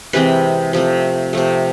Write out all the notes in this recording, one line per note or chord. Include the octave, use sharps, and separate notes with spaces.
C3 E3 G#3 C4 B4
C3 F3 A3
C3 F3 A3